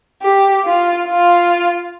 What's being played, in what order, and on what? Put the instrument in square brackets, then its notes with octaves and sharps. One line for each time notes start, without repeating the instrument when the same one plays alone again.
[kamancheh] G4
F4
F4